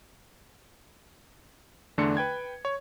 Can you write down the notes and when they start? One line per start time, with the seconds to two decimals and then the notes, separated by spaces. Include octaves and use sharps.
1.98 E2 D3 A3 D4 C6 C#7
2.17 B4 G5 G#6
2.65 C#5